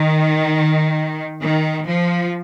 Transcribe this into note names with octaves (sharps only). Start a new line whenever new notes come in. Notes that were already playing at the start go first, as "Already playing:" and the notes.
Already playing: D#3
D#3
F3